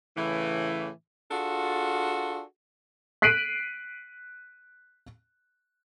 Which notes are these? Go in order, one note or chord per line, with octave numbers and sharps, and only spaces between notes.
A2 C#3 E3
D4 F4 F#4 G#4 A4
F#6 B6 C7 D7 D#7 F#7